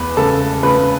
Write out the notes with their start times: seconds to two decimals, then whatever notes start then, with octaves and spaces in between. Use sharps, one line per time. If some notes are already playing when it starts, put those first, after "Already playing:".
Already playing: E2 B4
0.17 C#3 A4
0.63 C#3 B4